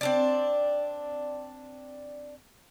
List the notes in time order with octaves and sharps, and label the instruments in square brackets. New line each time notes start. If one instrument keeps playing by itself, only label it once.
[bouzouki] C4 D4 D5